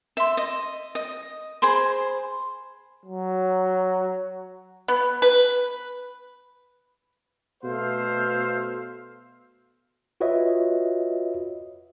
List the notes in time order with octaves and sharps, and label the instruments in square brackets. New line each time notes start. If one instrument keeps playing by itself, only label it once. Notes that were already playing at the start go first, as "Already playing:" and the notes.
[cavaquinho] E5 C6
D#5
D#5
G#4 C5 B5 C6
[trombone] F#3
[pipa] B3
B4
[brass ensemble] B2 A3 C5 E5 F5
[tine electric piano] F4 F#4 B4 C#5 D#5 E5